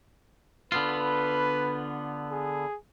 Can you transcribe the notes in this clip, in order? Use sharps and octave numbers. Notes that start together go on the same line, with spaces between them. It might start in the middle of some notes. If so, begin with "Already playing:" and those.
D3 B3 F4 B4
G#4